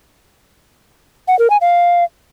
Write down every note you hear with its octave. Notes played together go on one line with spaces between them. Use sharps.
F#5
A#4
G#5
F5